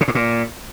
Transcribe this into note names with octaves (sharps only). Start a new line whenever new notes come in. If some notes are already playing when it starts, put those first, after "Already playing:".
C#3
A2
A#2